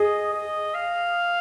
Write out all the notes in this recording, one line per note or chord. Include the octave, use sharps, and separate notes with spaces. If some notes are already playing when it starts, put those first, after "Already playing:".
Already playing: G#4 D#5
D#5
F5